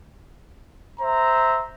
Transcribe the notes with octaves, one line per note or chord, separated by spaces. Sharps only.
C5 E5 A#5